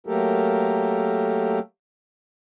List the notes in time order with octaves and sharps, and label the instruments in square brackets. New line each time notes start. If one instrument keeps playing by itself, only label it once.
[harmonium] F#3 A3 A#3 G4 A4 A#4